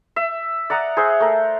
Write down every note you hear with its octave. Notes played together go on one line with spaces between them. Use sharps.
E5
D5 F#5 A#5 D#6
G#4 C5 E5 F#5
A3 A#4